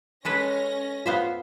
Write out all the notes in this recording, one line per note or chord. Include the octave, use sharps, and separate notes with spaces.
G#3 C#4 A4 B4 A#6
B3 F4 C5 E5 F5